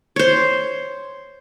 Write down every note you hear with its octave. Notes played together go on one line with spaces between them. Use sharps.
C5 C#5